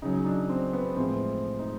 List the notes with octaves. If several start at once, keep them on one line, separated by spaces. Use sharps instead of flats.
C#3 F#3 D#4
D4
C4
B3
A2 F3 G#3 C4
D#4